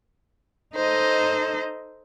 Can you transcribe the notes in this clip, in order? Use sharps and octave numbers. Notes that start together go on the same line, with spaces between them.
D#4 A4 C5 D#5